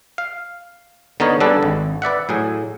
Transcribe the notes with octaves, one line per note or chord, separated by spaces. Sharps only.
F5
D3 B3 D#4 A#4 C#5
D3 G3 D4 G#4 A4 B4
G#1
B4 D5 E5 F#5
A2 F#3 G#4